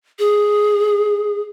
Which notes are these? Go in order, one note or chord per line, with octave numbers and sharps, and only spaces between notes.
G#4